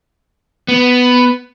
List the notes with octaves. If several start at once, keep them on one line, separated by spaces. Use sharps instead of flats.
B3